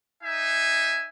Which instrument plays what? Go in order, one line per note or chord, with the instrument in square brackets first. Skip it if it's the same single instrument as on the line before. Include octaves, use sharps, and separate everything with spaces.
[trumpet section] D#4 E5 G#5